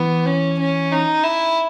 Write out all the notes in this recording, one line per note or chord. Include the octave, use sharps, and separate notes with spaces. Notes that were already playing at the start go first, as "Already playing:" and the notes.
Already playing: E3 B3
C#4
C#4
D#4
E4